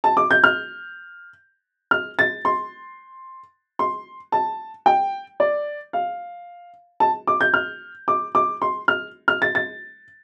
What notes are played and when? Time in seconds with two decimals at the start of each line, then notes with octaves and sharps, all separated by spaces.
0.04 A5
0.17 D6
0.31 G6
0.44 F6
1.91 F6
2.19 A6
2.45 C6
3.79 C6
4.32 A5
4.86 G5
5.40 D5
5.93 F5
7.00 A5
7.27 D6
7.41 G6
7.54 F6
8.08 D6
8.35 D6
8.62 C6
8.88 F6
9.28 F6
9.42 A6
9.55 A6